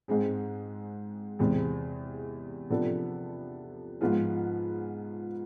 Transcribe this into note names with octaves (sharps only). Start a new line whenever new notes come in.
G#2 G#3 C4 G#4
E2 C3 G#3 C4 G#4
C3 F3 B3 D4 A4
G#2 F3 B3 F4 G#4